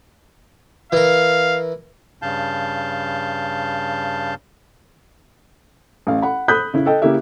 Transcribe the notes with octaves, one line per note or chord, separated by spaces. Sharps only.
E3 A#4 F5
G2 C#3 F5 A5 G6
A1 F5
F#5 B5
B5 D#6 F#6 G6 B6
C#3 E4
A4 D#5 G5
C#3 A#3 E4 G4 E5